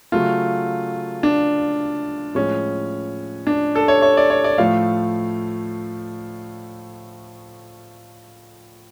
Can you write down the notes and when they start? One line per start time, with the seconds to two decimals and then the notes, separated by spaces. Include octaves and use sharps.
0.12 C#3 F#3 A3 F4
1.23 D4
2.35 A2 F3 G#3 C#4
3.47 D4
3.75 A4
3.88 C#5
4.02 C#5
4.17 D5
4.30 C#5
4.44 D5
4.58 A2 F3 A3 F5